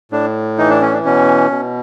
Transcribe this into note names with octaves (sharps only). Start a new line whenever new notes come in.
A2 D4
E3 D#4
D4
C#4
D4
B2 C#4
B2